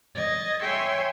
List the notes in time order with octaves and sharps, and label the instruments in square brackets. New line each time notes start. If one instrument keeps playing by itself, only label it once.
[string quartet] D#5 G#6 A6
C#5 E5 G5 G#5 C6 C#6